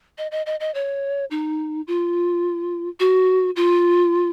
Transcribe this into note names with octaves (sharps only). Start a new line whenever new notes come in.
D#5
D#5
D#5
D#5
C#5
D#4
F4
F#4
F4